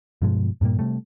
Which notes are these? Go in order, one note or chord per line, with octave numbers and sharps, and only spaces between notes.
G2 B2 F3 G#3
G2 A#2 G3 A#3
C3 G3 A3